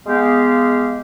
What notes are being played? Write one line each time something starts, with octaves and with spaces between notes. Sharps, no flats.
G#3 B3 G4 F5